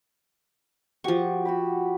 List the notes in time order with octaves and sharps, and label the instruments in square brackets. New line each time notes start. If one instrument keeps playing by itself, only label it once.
[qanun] F3 C#6 [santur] F#4 G4
[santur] F#4 G4 B5